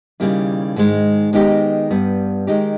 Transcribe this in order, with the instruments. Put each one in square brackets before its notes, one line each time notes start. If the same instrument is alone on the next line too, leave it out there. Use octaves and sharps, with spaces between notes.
[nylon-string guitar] D#2 C#3 G3 A#3 E4
G#2 D#3 G#3
D#3 G#3 B3 D#4 G4
G2 G3 B3
D#3 G#3 D#4 G4